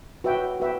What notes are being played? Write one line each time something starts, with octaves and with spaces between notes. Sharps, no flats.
F#4 B4 E5 G5
F#4 B4 E5 G5